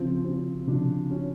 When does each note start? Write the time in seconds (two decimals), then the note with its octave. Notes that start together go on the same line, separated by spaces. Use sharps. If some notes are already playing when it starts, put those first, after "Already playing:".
Already playing: C#3 F3 C4
0.24 C4
0.67 C#3 F3 D4
1.11 C#4